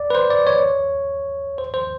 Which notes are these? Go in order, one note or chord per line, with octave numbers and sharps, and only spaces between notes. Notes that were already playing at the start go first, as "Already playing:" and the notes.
Already playing: D5
B4
C5
D5
C#5
C5
C5